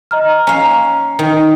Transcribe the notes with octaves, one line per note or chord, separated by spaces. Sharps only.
D#5 A#5 F6
C#4 F5 A#5
D#3